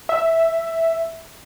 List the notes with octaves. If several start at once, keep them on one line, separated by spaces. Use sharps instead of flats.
E5